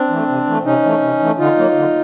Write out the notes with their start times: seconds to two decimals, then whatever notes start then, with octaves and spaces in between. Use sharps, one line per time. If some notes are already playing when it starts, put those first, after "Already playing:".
Already playing: C4 D4
0.10 E3 A3
0.29 C3
0.46 E3 A3
0.65 C3 C#4 D#4
0.83 E3 A3
1.02 C3
1.20 E3 A3
1.38 D3 D#4 F4
1.57 F#3 A#3
1.75 D3